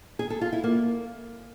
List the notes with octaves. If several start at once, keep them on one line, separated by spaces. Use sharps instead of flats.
G#4
A4
F4
E4
A#3